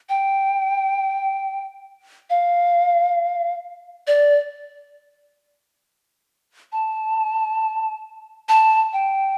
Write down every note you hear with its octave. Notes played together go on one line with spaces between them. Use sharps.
G5
F5
D5
A5
A5
G5